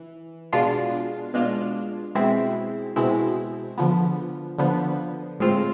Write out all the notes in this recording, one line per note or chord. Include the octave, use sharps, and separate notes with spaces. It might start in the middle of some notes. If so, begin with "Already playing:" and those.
Already playing: E3
B2 G#3 D4 F4
B2 G#3 D4 F4
B2 G#3 C4 E4
B2 G#3 C4 E4
D3 F3 B3
D3 F3 B3
A2 G#3 C4 F4